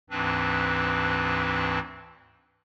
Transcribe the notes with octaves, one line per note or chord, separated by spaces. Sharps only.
D2 G#2 E3 C4 D4 B4